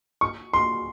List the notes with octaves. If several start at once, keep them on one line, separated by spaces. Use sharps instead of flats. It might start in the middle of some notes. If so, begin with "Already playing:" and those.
C#6
C6